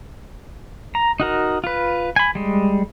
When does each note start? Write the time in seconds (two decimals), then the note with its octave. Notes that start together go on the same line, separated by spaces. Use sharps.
0.95 A#5
1.20 D#4 F#4 A#4
1.64 F4 B4
2.16 G#5 B5
2.35 G3 G#3